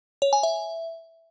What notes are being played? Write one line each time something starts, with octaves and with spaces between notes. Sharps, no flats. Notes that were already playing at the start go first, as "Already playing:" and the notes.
C#5
G#5
E5